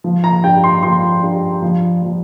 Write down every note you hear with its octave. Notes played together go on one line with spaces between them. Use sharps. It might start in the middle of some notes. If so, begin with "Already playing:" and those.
F3
A#5
G2 G5
C6
F3 C6
G2
F3
F3